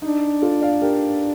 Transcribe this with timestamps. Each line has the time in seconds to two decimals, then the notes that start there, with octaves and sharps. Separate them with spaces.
0.02 D4 D#4
0.42 F4 A4
0.62 D5 F5
0.82 G4 A#4